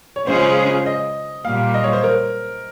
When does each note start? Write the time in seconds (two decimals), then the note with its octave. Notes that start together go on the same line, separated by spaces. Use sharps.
0.16 C#5
0.27 C#3 G#3 C#4 F4 G#4 C5
0.86 D#5
1.44 A#2 G3 A#3 F5
1.74 D#5
1.84 C#5
1.93 C5
2.04 A#4